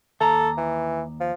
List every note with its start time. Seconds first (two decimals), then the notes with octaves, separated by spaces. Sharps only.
0.21 D#2 A4 A#5
0.58 E3
1.20 F3